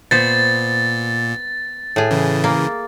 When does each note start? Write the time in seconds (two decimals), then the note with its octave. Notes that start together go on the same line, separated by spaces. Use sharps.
0.11 A#2 B3 C5 A6
1.96 A2 G#4
2.11 C#3 E3
2.44 A#3